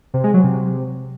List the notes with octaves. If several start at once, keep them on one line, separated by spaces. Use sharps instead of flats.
C3
G#3
F#3
C3